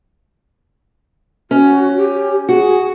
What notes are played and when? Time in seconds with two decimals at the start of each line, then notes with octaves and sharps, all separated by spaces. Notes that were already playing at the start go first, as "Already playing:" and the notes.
1.51 C#4 F#4
1.98 G4
2.49 F#4 G#4